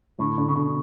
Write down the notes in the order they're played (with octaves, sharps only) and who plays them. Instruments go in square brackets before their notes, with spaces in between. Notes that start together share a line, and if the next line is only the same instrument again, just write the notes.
[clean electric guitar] A2 [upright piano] D3
[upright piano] D3
[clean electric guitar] C#3
[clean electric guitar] B2 [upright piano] D3